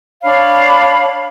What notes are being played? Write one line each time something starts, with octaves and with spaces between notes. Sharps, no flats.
D4 C#5 F5 B5